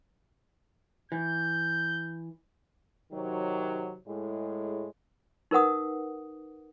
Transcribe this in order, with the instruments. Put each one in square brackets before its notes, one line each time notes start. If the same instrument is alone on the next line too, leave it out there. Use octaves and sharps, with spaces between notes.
[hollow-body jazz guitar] E3 [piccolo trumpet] G6
[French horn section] C3 D#3 F#3
A2 G#3
[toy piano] D#4 A#4 B4 F#5 D#6